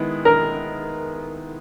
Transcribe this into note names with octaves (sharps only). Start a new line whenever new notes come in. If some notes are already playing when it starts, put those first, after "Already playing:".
Already playing: D#3 G#3 B3 E4
A#4